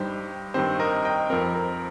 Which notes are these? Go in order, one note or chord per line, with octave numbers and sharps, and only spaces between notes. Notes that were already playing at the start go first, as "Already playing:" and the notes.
Already playing: G2 G3 D#4 G4 C5
G2 D#3 C4 G4 C5
A#4 D#5
D#5 G5
F2 F3 C4 A#4
A#4